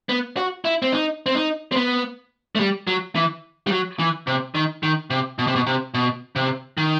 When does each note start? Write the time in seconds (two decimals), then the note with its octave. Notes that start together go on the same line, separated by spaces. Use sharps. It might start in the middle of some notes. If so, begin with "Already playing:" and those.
0.09 B3
0.37 F#4
0.65 E4
0.82 C4
0.92 D#4
1.26 C4
1.35 D#4
1.72 C4
1.76 B3
2.55 A3
2.60 G3
2.87 F#3
3.15 E3
3.67 G3
3.72 F#3
3.99 E3
4.27 C3
4.55 D#3
4.83 D#3
5.10 C3
5.39 B2
5.47 C3
5.56 B2
5.67 C3
5.94 B2
6.36 C3
6.77 D#3